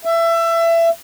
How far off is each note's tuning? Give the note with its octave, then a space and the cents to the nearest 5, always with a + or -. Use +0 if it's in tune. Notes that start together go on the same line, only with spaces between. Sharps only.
E5 +25